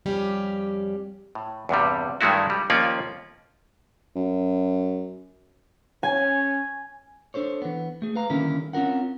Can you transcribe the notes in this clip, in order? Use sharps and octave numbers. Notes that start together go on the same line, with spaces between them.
F2 G3 C#4 G4
A2
E2 G2 C3 G3
G2 D#3 G#3 A3 E4 F#4
G3
D#2 F3 A#3 C#4 F4 D5
F#2
C#4 G#5
D4 A4 C5 C#5
E3 B3
A3 G#4
B4 F5 A#5
D3 D#3 G3 A#3 C#4 E4
C4 C#4 F4 A#4 F#5